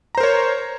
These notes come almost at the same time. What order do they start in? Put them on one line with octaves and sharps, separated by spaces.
A#5 C5 A#4 C#5